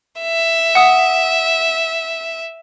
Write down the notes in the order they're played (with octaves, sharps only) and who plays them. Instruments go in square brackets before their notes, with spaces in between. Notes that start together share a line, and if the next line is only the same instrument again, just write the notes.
[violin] E5
[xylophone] F#5 D#6